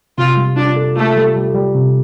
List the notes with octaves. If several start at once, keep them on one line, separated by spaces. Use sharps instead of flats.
C3 F4
G3
D4 F4
A4
A3 F4
G3
G3
G3
C3